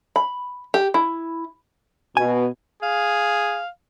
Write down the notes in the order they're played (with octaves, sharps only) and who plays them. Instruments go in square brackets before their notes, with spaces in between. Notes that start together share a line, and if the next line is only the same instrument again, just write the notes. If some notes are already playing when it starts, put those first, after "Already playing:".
[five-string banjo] B5
G4
E4
[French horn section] B2 [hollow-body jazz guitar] G#5
[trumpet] G#4 [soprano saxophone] F5